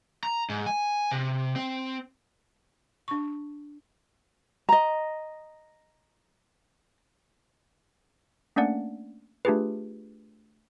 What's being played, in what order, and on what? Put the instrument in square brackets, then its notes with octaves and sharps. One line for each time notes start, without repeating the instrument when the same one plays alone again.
[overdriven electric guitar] A#5
G#2
G#5
C3
C4
[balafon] D4 C#6
[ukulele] D#5 A#5
[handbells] A3 A#3 C#4 D4 D5 F#5
A3 D4 F4 G4 G#4 B4